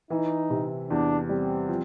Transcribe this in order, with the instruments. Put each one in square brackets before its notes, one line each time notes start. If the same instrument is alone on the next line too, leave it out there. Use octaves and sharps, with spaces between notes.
[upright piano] E3 [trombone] D#4
[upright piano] C3
[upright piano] E2 [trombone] D4
[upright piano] G3 [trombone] C4
[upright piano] F3